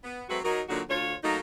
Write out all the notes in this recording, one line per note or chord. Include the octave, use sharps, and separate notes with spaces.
B3
F#3 G#3 A3 C4 F#4 B4
F#3 D#4 A#4
A#2 D3 F#3 D#4 F#4
D2 F4 C#5
F#3 A3 A#3 D#4